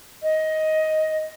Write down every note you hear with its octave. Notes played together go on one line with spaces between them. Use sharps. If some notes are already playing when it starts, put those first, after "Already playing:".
D#5